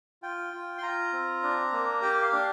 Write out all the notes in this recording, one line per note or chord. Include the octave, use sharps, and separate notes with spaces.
F4 G5
F4
C6
F4 A#5
C4
D4
A#3
G4 G5
F5
D4